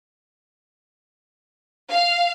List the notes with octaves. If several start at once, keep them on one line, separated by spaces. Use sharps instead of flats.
F5